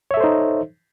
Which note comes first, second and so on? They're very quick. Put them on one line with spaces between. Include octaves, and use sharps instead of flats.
C#5 E5 A4 C5 D#4